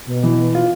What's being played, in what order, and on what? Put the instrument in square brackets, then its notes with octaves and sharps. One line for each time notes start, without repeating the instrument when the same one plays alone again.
[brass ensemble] B2
[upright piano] E3
F4